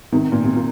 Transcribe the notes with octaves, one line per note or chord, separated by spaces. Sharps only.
C3 D#3
A#2
C3
A#2